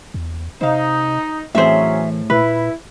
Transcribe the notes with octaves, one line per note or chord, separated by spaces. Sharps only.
E2
C3 D#4 C5 F5
A2 E3 F#3 C4 C#4 G#4 C5 E5
A#2 E4 B4